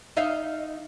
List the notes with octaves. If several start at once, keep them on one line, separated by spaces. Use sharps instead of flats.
D#4 E5 F5